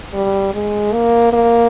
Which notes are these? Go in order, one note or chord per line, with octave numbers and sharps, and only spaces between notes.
G3
G#3
A#3
A#3